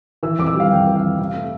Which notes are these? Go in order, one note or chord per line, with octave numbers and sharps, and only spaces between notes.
E3 E6
F2 D6
E6
G3
F5
F2 G5
E3
F5
F2
C3 F5
A3